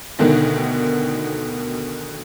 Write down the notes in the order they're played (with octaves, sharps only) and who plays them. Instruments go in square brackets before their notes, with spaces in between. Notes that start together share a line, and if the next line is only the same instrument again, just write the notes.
[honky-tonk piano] D2 B2 D3 D#3